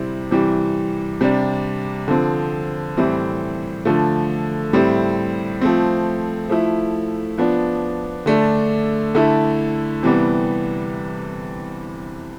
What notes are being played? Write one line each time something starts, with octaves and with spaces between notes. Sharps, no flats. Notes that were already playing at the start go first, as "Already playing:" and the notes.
Already playing: C3 G3 C4 E4
C3 E3 G3
C3 G3 D4
D3 F3 C4
A2 E3 G3 C4 E4
D3 F3 A3
A2 G3 C4 E4
F3 A3 C4
F3 A3 E4
F3 B3 D4
D3 A3 D4
D3 A3 E4
C3 E3 G3 B3